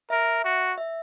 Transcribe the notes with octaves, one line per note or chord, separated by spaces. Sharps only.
A#4 E5
F#4
E5